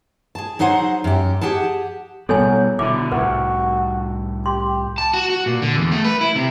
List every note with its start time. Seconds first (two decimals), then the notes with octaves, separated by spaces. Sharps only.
0.35 G#4 A5
0.59 F#3 D#4 G#4 C5 F#5
1.04 F#2 G4
1.41 G4 G#4 F#5 A5
2.29 B2 F#3 G3 B3 A4 C#5 G#5
2.79 B2 D3 E4 D6
3.12 C2 A2 F#4 B4
4.46 G4 C6
4.98 A5
5.14 F#4
5.30 F#4
5.46 A#2
5.62 D3
5.76 E2
5.91 A3
6.04 B4
6.21 E4
6.35 C3